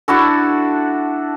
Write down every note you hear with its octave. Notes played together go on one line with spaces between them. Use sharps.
D4 E4 F#4 A4